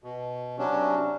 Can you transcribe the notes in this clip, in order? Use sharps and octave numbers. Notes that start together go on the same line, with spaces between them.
B2
C3 F#3 C#4 D4